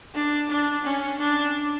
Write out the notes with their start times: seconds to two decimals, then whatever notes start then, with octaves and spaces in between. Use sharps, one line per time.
0.15 D4
0.50 D4
0.85 C#4
1.20 D4